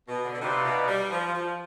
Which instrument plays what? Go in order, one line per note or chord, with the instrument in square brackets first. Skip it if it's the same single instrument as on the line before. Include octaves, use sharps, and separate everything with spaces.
[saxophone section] B2
D3
B2
[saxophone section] C3 [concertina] D#4 B4 D5 F5
[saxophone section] B2
G3
F3
F3